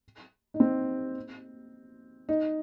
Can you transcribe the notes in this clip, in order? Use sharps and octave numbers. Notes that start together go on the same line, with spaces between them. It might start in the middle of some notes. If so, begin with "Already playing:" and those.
D#4
C4
D#4